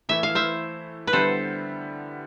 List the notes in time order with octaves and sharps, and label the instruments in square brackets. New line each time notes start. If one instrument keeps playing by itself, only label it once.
[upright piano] E3 A3 E4 [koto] E5
[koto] F5
C5 E5
B4
[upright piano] D3 G3 B3 E4 [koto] A4 C5